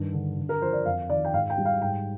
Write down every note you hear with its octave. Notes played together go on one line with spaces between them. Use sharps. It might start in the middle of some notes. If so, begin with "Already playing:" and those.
Already playing: G2 D#3
D3
D3
A#4
F3 C5
D5
F2 F5
D#3 D5
G5
G#2 F5
G5
G3
F5
G#2 G5